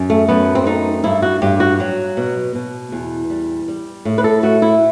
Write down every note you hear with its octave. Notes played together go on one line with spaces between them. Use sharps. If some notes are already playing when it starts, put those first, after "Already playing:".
Already playing: F#2
A3
F#2 B3
C4
A3 D#4
G2 E4
F#4
G2 G4
F#4
F#3
B2
B2
E2
G3
G3
A2
B4
A4
A3 F#4
E4